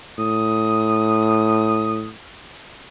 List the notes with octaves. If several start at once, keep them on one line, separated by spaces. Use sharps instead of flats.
A2 D#6